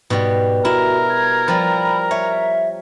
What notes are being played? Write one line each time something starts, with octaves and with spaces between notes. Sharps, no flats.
G#2 B2 G3
E4 F#4 A#4
G#6
F3 G3 B5
C#5 E5